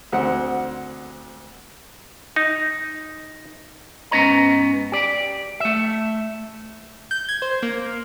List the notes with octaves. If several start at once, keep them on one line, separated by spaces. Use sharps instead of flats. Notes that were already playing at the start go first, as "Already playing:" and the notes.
D2 C4 F#5
D#4
G#2 B3 C#4 C#5 D#5 A#5
G4 D5
A3 E5
G6
G#6
C5
A#3